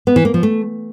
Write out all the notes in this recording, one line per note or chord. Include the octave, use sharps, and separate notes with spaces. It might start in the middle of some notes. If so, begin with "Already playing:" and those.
B3
E3
A#3
F3
A3